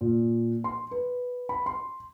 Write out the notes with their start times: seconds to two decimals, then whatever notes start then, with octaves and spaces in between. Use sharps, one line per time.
0.01 A#2
0.64 C6
0.91 B4
1.49 B5
1.66 C6